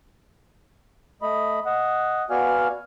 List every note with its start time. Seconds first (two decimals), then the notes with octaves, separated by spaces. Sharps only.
1.22 A3 D#5 B5
1.66 D#5 F#5
2.30 B3 F#4 D5 F5 G#5 F6